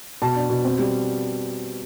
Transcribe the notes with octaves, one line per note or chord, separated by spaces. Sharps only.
B2 A5
D4
B2
C4
G3